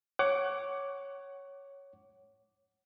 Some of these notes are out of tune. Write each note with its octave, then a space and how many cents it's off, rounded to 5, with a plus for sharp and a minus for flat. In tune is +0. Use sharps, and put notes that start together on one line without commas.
C#5 +0 F#5 +25 D6 -5